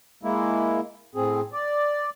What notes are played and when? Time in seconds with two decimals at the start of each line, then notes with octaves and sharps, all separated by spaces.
0.23 G#3 A#3 E4
1.15 A2 C4 G#4
1.53 D5